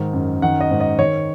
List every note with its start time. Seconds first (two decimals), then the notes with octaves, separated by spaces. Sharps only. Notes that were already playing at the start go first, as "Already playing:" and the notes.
Already playing: G#2 D#3
0.13 F#2
0.42 D#3 F#5
0.61 D#5
0.71 G#2
0.80 D#5
0.98 D#3 C#5